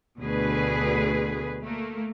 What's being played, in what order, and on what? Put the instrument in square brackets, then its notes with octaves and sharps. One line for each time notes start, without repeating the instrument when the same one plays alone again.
[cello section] D2 B2 D3 G#4 B4
A3 A#3